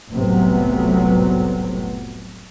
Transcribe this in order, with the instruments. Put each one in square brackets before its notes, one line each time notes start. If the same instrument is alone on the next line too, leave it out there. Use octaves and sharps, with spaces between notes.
[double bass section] F1 C2 A2 C3 F#3 B3